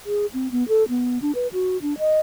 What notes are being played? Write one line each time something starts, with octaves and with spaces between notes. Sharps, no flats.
G#4
C4
B3
A4
B3
D4
B4
F#4
D4
D#5